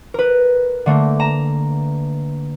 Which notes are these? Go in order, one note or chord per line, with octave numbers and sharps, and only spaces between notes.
A#4 B4
D3 A3 A#3
A#5 E7